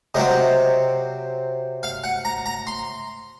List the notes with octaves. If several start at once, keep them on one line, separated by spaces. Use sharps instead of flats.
C3 F#3 C4 D#5
F5
F#5
A#5
A#5
C6